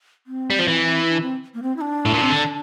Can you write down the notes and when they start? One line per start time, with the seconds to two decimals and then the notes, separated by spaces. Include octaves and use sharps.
0.27 C4
0.50 G3
0.59 F3
0.68 E3
1.09 D4
1.22 C4
1.54 A#3
1.62 C4
1.76 E4
1.81 D4
2.05 A2
2.14 A#2
2.23 C3
2.31 D3